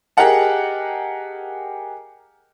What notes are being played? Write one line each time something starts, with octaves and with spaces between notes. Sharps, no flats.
G4 G#4 A#4 D#5 F#5 A5